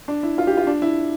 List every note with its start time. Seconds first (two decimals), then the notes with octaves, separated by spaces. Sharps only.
0.08 D4
0.23 E4
0.38 F4
0.47 G4
0.57 F4
0.67 D4
0.82 E4